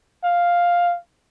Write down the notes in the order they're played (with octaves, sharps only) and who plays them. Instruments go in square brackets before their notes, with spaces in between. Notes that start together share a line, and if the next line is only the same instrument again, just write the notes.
[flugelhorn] F5